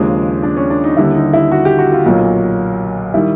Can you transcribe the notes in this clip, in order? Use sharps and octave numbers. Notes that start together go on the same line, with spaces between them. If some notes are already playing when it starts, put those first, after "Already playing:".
Already playing: D#2 C#3 F3 G#3 D4
D4
C#4
D4
D#4
D#2 D3 G3 E4
D#4
E4
F#4
G4
F#4
F4
B1 A#2 F#3
D#3 G3 E4